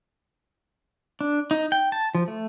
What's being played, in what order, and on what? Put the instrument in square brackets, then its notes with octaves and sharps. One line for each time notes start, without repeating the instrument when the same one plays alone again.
[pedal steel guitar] D4
D#4
G5
A5
F3
A3